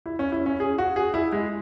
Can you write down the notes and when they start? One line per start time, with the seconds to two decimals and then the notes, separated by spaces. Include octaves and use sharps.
0.06 E4
0.19 C#4
0.32 E4
0.46 C#4
0.60 G#4
0.78 F#4
0.96 G#4
1.14 E4
1.32 G#3